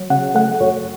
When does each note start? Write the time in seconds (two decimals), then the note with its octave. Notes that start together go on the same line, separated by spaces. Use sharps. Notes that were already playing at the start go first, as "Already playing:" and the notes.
Already playing: F#3
0.10 C#3 F#5
0.35 A3 F#5
0.60 F#2 C#5